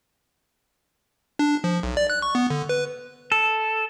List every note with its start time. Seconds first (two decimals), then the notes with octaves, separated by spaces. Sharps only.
1.39 D4
1.64 F3
1.83 B1
1.97 D5
2.10 F#6
2.22 C#6
2.35 B3
2.50 D3
2.69 B4
3.32 A4